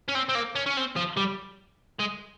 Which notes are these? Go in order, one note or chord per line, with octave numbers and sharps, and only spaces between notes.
C#4
C4
C4
A#3
C#4
C#4
C4
F3
G3
G#3